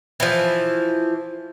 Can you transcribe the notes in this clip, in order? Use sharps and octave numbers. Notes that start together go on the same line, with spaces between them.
E3 F3